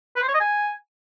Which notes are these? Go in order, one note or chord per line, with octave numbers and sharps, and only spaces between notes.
B4
C5
C#5
D#5
G#5